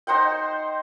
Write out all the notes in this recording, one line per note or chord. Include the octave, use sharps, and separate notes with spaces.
D#4 C5 F#5 G5